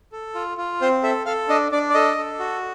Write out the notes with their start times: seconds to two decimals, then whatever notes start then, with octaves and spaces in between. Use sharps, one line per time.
0.12 A4
0.35 F4
0.57 F4
0.81 C4 C5
1.03 A4 E5
1.26 A4 F5
1.48 D4 D#5
1.72 D4 D5
1.90 D5
1.94 A4 D#5
2.18 A4
2.39 F#4